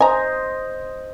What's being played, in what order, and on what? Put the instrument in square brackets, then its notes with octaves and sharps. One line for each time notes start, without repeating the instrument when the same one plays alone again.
[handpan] C5 D#5 [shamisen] G#5 A#5